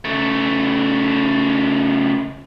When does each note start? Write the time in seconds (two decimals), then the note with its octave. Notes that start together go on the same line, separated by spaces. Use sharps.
0.05 C#3 A3